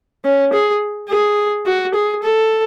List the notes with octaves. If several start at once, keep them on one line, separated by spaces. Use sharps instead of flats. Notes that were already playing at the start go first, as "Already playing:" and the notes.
C#4
G#4
G#4
F#4
G#4
A4